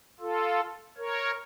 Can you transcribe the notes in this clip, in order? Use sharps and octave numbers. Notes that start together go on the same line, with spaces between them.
F4 A4
A#4 C#5